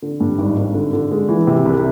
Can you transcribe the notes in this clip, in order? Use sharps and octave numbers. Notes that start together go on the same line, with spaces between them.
D3
G2
G#1
G#1
D3
D3
G#3
E3
C3
C2